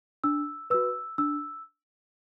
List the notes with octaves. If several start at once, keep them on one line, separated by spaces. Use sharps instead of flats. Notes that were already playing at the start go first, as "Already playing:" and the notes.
D4 E6
F#4 B4 E6
D4 E6